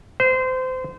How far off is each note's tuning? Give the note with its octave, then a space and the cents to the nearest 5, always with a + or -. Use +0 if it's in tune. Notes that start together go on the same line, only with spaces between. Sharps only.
C5 -25